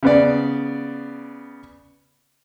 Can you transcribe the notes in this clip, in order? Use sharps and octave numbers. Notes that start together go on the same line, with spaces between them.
C#3 B3 D5